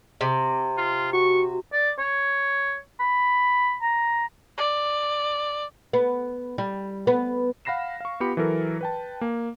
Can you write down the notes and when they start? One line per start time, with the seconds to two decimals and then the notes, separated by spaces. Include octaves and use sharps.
0.21 C3
0.78 F4
1.13 F#4 C#6
1.73 D5
1.99 C#5
3.00 B5
3.82 A#5
4.58 D5
5.93 B3
6.58 G3
7.07 B3
7.65 F5 F#5 B5 A#6 C7 E7
8.00 F5 C#6
8.20 B3 F4 G4 B5 C#7
8.37 E3 F#3 A4 A#4
8.81 B4 G5 A5
9.21 A#3